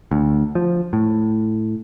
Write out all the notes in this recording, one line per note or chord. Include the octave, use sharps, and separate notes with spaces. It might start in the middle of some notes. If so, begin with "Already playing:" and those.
D2
F3
A2